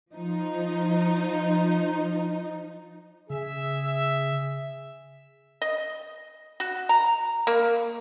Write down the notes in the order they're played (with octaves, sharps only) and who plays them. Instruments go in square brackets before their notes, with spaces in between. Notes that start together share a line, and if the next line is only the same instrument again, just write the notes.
[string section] F3 D#4
[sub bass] C#3 [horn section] G#4 E5
[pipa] D#5
F#4
A#5
A#3